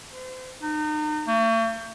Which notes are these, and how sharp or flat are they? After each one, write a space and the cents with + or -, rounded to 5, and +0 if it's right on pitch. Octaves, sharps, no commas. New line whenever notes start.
C5 -35
D#4 -35
A3 +45